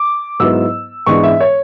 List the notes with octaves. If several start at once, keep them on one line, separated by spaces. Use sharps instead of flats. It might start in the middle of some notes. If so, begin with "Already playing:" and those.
Already playing: D6
G#2 F#3 B3 E4 E6
G#2 E3 G#3 B3 D4 C#6
E5
C#5